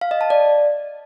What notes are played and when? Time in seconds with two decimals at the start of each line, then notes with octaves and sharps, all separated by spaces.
0.01 F5
0.11 D#5
0.21 A5
0.30 D5